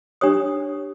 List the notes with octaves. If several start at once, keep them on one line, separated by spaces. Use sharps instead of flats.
D4 G4 C#5 D#6